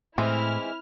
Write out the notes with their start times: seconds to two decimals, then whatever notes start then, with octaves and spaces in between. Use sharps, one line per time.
0.18 A2 E3 G#3 C4 E4 F6